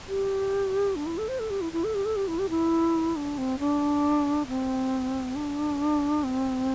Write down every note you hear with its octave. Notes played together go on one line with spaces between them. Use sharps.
G4
D4
E4
A4
C5
A4
G4
E4
E4
A4
G4
A4
G4
E4
G4
E4
D4
C4
D4
C4
D4
C4